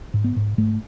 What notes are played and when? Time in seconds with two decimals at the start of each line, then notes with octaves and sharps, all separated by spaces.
0.14 G#2
0.24 B3
0.36 G#2
0.58 G#2 A3